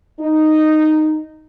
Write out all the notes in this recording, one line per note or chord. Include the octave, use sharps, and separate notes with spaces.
D#4